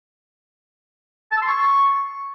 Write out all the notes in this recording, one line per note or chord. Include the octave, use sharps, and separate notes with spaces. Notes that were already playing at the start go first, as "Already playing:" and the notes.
A5
E6
C6
C#6